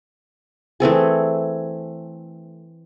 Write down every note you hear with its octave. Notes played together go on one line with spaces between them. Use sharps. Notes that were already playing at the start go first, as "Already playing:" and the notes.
E3 A3 C4 G#4